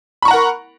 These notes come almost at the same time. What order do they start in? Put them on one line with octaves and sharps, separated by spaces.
B5 C#6 A#5 F#5 A#4